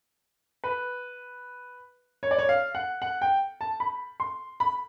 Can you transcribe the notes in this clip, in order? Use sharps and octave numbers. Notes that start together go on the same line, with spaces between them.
B4
C#5
D5
C#5
F5
F#5
F#5
G5
A5
B5
C6
B5